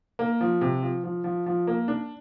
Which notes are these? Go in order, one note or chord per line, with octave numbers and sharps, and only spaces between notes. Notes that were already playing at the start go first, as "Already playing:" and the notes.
A#3
F3
C3
F3
F3
F3
F3
A#3
D4